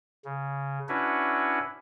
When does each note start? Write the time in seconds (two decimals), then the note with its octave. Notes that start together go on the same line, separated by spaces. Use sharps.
0.25 C#3
0.89 C#4 D4 E4 F#4 B4 C#5